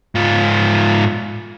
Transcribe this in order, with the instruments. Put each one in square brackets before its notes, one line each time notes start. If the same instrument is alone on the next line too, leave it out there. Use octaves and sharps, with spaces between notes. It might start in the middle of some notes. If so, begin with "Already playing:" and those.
[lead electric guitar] G#2 F4